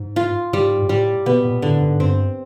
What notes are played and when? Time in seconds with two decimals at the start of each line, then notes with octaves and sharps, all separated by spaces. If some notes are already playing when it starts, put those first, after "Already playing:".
Already playing: G#2
0.16 F4
0.53 G#2 G3
0.82 G#2
0.89 A2 G3
1.26 B2 B3
1.45 A#2
1.62 A2 D3
1.81 G#2
2.00 G2 C4